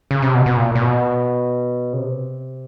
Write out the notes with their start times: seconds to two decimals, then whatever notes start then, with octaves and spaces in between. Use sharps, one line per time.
0.11 C#3
0.22 C3
0.34 B2
0.46 B2
0.57 A#2
0.75 A#2
0.80 B2
1.93 C#3
1.98 C3